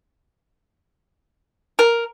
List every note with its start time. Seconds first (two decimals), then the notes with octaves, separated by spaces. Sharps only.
1.79 A#4